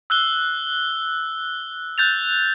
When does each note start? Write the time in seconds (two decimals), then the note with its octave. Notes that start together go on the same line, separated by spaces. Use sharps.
0.10 E6 F#6 G7
1.98 F#6 G6 A6 F7